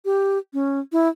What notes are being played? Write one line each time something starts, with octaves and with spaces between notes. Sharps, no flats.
G4
C#4
E4